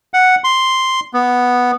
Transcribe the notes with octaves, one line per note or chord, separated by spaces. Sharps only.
F#5
C6
B3